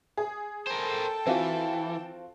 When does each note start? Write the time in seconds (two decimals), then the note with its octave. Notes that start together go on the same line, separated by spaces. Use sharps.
0.17 G#4
0.67 A4 A#4 C5 G5 A5
1.27 E3 C4 F4 F#4